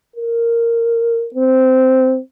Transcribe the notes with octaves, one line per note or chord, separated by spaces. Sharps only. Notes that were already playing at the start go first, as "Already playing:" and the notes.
A#4
C4